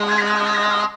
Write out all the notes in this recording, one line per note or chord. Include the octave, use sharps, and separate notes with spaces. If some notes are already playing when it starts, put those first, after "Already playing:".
Already playing: G#3